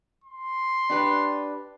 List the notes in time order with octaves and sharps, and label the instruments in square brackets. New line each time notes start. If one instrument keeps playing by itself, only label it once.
[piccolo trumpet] C6
[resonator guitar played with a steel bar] D4 G4 B4